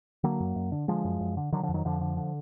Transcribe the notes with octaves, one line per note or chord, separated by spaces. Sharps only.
D3 F#3 A#3
F#2
F#2
D3
D3 F3 G#3
F#2
F#2
D3
D3 D#3 F#3
D3 F3
F2
D#3 F#3
F2 D3 F3
D3
D3